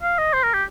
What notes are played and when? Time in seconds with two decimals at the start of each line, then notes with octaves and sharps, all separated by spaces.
0.03 F5
0.18 D#5
0.33 C5
0.43 A#4
0.54 G4